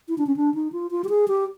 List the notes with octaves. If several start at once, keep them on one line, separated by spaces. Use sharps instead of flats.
E4
D4
C#4
D4
D#4
F4
F4
G4
G#4
G4